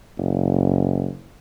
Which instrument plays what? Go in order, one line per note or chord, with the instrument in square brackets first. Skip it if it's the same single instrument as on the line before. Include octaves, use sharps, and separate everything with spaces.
[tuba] F#1